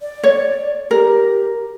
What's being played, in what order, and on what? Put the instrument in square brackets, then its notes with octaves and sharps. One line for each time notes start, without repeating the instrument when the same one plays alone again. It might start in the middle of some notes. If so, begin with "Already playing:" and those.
[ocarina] D5
[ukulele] C#5
[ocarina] G4 [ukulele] A#4